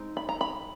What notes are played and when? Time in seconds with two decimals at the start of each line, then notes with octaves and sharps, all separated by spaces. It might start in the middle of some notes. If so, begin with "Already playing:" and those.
Already playing: G#3 C4 D#4
0.17 B5
0.29 A#5
0.41 B5